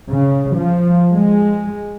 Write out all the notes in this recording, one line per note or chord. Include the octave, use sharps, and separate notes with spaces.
C#3
F3
G#3